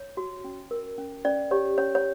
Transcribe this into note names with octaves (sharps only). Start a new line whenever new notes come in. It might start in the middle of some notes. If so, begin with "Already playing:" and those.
Already playing: C#5
F#4
C#4
A#4
C#4
C#4 D5
G4 C#5
C#4 C#5
C#5